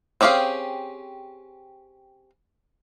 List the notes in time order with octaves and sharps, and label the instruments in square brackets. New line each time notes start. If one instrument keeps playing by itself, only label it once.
[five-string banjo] C4 C#4 G4 G#4 F5